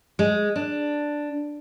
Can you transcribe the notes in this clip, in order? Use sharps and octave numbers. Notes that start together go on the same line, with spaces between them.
G#3
D4